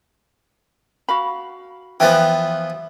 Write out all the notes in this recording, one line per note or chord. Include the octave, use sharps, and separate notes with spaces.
F#4 F5 B5
E3 F3 B3 B4 G5